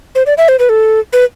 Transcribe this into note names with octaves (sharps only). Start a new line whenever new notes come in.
C5
D5
E5
C5
B4
A4
B4